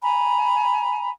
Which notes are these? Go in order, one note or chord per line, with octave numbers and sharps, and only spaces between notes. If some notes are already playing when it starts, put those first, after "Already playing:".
G#5 A#5 B5